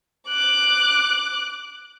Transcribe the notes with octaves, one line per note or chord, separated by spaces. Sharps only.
D6 F#6